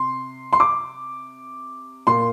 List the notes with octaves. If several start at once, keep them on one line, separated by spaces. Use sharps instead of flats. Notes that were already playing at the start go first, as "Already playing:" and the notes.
Already playing: C3 C6
C6
D6
A#2 A#3 C6